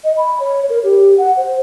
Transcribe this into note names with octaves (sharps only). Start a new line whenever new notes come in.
D#5
B5
C#5
A#4
G4
F#5
C5